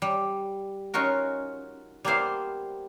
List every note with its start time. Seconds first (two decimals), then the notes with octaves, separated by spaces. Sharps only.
0.02 G3
0.94 C#4 D#4 F4 F#4 A#4
2.05 G3 A#3 B3 E4 C5 F5